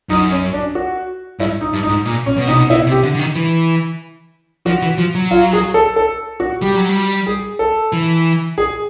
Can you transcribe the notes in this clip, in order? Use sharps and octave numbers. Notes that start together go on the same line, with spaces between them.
F#2 D#4
C#4
D4
F#4
G2 E4
D#4
G2
D#4
G#2
A#2
C#4
B2
C3 D#4
B2
B2 E4
C3
G4
D3
D3
D#3
E3
F3 F#4
E3
F3
F#3
F4
G#4
A4
A4
F#4
G3 G4
F#3
G3
G#4
A4
E3
G#4